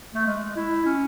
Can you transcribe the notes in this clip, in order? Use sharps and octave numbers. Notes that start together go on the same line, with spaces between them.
A3
G#3
E4
C#4